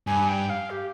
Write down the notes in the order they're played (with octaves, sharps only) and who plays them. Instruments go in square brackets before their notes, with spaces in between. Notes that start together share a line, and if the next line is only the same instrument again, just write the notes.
[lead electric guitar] G2 [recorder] G#5
[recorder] G5
F5
G4